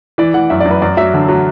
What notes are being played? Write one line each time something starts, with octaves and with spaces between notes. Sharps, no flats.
E3 D5
E3 F#5
F#2 E5
D5
F#2
B4
F#2 D5
F#3 E5
D3
F#3